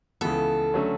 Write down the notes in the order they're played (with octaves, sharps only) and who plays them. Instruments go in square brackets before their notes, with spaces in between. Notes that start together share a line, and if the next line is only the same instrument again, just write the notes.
[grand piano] C#2 C#3 E3 B3 [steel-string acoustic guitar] A4
[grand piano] D3 F#3 A3 C#4